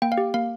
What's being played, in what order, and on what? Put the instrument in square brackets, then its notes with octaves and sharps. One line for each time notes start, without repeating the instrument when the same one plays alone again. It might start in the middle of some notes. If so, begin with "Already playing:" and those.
[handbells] A#3 G5
F5
G4
A#3 F5